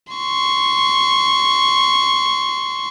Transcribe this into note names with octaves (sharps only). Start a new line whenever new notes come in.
C6 C#6